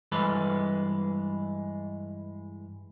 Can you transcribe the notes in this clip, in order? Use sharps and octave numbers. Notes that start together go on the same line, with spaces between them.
G2 E3 G#3 A4 B4